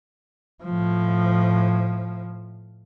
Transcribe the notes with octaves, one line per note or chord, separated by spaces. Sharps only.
A2 F3